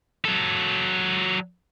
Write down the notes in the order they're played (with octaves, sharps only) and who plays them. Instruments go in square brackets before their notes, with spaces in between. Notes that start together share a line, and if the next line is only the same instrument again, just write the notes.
[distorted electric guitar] F#3 A4